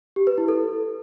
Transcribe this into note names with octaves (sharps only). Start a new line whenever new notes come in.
G4
B4
E4
A4